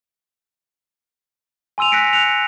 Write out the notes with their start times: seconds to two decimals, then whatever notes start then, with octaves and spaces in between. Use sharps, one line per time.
1.78 G#5 C6 E6 D#7 F7
1.92 F#6 A#6 B6 C#7 D7
2.13 F#6 C#7 F7